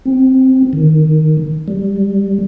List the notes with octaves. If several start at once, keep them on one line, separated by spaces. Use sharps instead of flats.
C4
D#3
G3